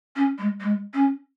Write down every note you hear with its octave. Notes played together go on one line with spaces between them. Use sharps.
C#4
G#3
G#3
C#4